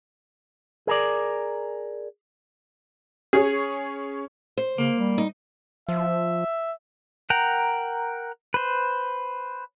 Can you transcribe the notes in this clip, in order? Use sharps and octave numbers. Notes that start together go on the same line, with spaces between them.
G#4 A#4 D5
C#4 G#4 C#5
C5
C#3 A#3
G3
D#4
F3 E5
A#4 F#5 G5 A#5
B4 C5